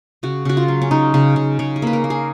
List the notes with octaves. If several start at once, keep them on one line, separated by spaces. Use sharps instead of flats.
C#3 F#4
C#3 F#4
F4
F#3
C#4
C#3 D#4
C#3
C#3
C#3 C#4
G#4
A#3 B4
A#4
A#3
G#4